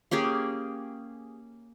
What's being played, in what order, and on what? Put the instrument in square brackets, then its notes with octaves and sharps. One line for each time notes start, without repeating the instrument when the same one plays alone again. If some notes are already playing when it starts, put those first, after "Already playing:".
[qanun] A#3 C#4 G4 G#4